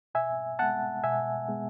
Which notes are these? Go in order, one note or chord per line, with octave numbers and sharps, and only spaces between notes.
B2 E5 G#5
G#3 B3 F#5 A5
B2 E5 G#5
G#3 B3